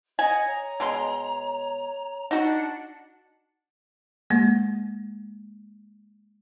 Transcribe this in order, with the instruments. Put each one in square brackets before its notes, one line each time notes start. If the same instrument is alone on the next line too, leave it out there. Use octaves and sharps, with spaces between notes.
[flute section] D#5 F#5 [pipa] G#5
[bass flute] C#5 [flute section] A#5
[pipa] B2 G#3 C6
[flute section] D4 F#5 A5 [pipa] D#4 F#4
[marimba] G#3 A#3